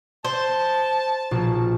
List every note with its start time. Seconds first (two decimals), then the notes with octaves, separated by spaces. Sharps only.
0.25 C5 A5
1.31 A#1 B2